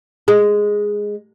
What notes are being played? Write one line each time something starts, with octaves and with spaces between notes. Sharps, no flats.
G#3